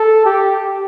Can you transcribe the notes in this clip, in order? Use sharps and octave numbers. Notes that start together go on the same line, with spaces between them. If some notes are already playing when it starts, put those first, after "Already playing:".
Already playing: A4
G4